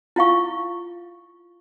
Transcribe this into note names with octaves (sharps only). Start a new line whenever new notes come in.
E4 F4 F5 C#6